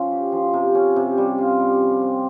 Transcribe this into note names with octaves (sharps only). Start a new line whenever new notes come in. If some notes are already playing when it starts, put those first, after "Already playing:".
Already playing: F3 C#4 F4
G4
F3
C3
C#4
C3
G3
F4
G3
F3
C4